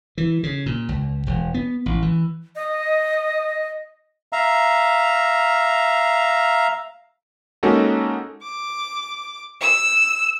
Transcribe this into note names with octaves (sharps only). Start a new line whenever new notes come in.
E3
C#3
A#2
C#2
E1
B3
A1
E3
D#5
E5 F5 A#5
G#3 A#3 C#4 D#4 F#4 A4
D6
E6